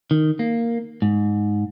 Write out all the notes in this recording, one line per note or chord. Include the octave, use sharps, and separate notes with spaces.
D#3
A#3
G#2